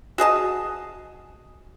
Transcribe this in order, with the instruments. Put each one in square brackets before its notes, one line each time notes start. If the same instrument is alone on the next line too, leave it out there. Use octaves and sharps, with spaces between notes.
[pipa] F#4 G#4 D#5 A5